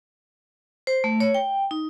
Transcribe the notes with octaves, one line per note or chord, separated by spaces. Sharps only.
C5
A3
C#5
G5
D#4